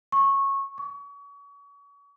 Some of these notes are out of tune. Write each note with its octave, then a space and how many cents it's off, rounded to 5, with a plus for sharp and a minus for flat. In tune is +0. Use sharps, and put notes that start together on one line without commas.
C#6 -15
C#6 +35